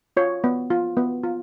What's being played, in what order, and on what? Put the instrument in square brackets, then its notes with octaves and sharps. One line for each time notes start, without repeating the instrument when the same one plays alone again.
[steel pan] F4 C#5
B3
F4
B3
F4